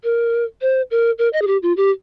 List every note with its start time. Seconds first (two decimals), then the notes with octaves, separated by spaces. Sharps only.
0.04 A#4
0.62 C5
0.91 A#4
1.19 A#4
1.33 D#5
1.42 G#4
1.47 G4
1.63 F4
1.77 G4